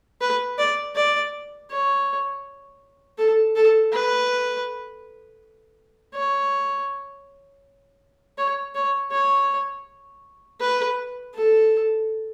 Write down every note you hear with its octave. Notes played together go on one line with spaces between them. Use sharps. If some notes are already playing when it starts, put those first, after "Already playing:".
B4
D5
D5
C#5
A4
A4
B4
C#5
C#5
C#5
C#5
B4
A4